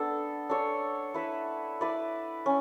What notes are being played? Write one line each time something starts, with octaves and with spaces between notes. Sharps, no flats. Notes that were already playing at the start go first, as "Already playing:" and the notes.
Already playing: B3 D4 A4
D4 A4 C#5
E4 B4 E5
E4 B4 D5
C#4